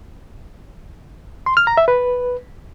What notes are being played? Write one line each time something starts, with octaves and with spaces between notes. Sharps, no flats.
C6
F6
A#5
E5
B4